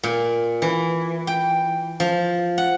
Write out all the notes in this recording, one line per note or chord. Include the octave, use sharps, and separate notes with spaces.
A#2
E3
G5
F3
F#5